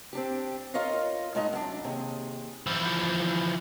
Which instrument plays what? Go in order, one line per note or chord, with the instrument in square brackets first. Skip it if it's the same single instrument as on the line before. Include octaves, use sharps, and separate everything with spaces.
[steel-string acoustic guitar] C4 D4 G4
F4 A#4 C#5 D#5 F5
A2 G#3 D#4 D#5
F#2 D4
D#2 C3 G#4
[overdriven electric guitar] E3 F3